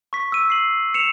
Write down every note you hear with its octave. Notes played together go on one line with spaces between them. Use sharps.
C#6 B6
E6 D#7
C7 F#7
C#7 E7 F7